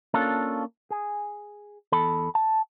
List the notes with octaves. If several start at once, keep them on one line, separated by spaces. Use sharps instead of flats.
A#3 C#4 D4 F4 A4
G#4
E2 A4 A5 B5
A5